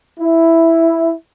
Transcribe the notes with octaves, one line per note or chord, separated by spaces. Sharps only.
E4